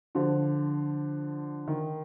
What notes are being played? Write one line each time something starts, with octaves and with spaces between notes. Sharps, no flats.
D3 F3
D#3